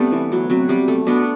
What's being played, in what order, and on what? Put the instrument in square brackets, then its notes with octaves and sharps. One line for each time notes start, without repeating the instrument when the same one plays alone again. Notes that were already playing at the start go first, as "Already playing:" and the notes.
Already playing: [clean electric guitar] C3 [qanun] G3 A3 B3 D4
[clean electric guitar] E3
[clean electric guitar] D2 [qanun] F#3
[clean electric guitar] C3 [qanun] F#3
[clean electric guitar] C3 [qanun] G3
[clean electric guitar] B1 [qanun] A3
[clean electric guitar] B2 [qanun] B3 D4